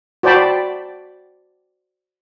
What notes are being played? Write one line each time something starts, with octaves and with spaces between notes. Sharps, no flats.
F#4 C5 D5 G5 A5 B5